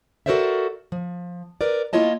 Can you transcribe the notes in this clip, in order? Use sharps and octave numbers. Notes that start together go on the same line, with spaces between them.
F#4 A4 A#4 C5 D5 E5
F3
A#4 B4 D5
A#3 E4 F4 C#5 D#5 A5